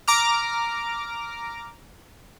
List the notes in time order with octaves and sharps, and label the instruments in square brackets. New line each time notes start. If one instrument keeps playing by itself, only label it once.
[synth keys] A#5 D6 F6